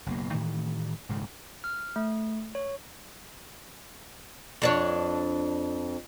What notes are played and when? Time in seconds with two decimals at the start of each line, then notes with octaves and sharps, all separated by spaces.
0.06 F#1 B1 A#3
0.33 A2 D#3 E3 A3
1.09 D#1 G#2 C#3
1.64 F6
1.96 A3
2.55 C#5
4.62 F2 D4 C#5